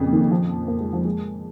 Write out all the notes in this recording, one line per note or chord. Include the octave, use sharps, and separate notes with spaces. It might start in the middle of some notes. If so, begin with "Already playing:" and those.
Already playing: F2 A#2 C#3
D#3
F3
A#3
G#3
F3
G#3